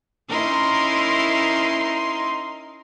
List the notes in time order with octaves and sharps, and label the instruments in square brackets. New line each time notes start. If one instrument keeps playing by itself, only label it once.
[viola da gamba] C#4 E4 A#4 [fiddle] D#4 C6